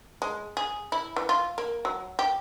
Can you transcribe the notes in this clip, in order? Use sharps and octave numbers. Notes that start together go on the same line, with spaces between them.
G#3
G#4
E4
E3
F4
A#3
F#3
G4